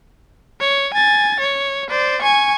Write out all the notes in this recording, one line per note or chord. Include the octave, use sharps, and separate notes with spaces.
C#5
G#5 A6
C#5
C5 D5
G#5 C#6